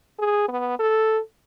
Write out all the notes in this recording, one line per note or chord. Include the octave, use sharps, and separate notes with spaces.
G#4
B3
A4